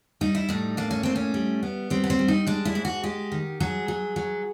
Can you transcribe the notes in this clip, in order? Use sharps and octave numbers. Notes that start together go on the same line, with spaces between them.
G3 D#4
E4
A2 D#4
A#3 D4
C#4
A2 C4
C#4
G3
B3
G3 C4
B3
C4
G3
D#4
G#3 D4
E4
G#2
F#4
G#3 G4
D#3
F#3 G#4
F#3
F#3